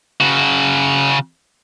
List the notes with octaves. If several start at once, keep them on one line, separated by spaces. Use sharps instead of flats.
C#3 F#4